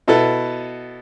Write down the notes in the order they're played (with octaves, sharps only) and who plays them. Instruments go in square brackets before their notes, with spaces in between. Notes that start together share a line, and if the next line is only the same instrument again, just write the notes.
[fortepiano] B2 B3 E4 A4